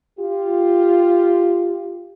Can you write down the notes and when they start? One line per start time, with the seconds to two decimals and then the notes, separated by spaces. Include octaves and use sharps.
0.19 F4 G4